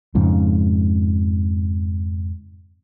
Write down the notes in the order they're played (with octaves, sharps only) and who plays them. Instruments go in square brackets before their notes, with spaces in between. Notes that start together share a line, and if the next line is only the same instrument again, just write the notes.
[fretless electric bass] F2 G#2 C#3